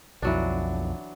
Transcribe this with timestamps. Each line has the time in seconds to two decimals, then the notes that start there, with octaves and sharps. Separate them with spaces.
0.22 B1 F2 E3 F#3 D4